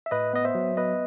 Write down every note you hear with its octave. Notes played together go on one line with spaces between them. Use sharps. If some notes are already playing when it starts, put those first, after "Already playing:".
E5
A2 B4 D#5
B3 D#5
C5 E5
F#3
B3 B4 D#5